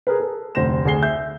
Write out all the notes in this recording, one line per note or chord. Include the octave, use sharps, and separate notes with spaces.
G#4 A#4 B4
A4
F1 D2 C5 A#6 E7
D2 G#4 G#5 C7 G7
E5 G6